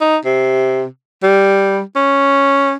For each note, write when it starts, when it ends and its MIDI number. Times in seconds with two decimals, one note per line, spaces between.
0.01 0.17 63
0.25 0.85 48
1.23 1.80 55
1.96 2.74 61